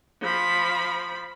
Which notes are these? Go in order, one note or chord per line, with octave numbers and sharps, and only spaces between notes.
F3 B5